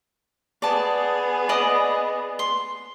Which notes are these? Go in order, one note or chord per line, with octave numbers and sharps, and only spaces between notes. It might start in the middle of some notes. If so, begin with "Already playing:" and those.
B3 G#4 D5 A5
D5 D#5 D#6
C6